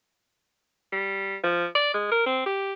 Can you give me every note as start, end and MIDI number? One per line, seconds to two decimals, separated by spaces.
0.92 1.36 55
1.44 1.66 53
1.75 1.91 74
1.94 2.10 56
2.11 2.22 70
2.26 2.44 60
2.46 2.73 67